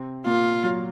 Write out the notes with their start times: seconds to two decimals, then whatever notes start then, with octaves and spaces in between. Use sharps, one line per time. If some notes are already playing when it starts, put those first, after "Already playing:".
Already playing: C3 C4
0.25 A#2 A#3 F4
0.64 F#3